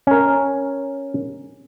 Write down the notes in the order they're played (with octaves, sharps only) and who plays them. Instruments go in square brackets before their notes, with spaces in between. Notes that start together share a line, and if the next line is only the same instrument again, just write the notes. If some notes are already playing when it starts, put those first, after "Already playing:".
[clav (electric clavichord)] C#4 A#4